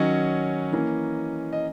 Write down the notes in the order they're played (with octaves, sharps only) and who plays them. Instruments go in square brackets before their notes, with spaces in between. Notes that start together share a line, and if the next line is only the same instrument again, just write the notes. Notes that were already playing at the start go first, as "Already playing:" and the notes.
Already playing: [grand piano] D#3 F#3 C#4 D#5
E3 A#3 C#4
D#5